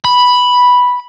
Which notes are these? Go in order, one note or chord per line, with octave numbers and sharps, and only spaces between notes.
B5